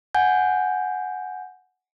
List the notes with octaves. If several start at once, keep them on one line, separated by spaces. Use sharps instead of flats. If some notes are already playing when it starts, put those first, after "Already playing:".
F#5 G#5 G6